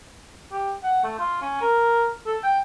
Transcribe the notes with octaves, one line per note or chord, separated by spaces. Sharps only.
G4
F#5
A3
F4
C#4
A#4
A4
G5